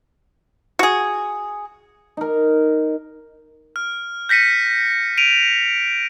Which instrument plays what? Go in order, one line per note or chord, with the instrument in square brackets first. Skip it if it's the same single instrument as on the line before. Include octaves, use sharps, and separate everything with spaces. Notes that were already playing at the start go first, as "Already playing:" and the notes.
[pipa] F#4 G#4
[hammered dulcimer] D#4 A#4
[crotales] F6
G6 A#6 B6 C#7 D#7
D7 D#7 F7